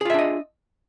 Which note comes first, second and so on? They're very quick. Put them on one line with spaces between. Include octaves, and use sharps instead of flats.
G#4 F4 E5 D4 D#5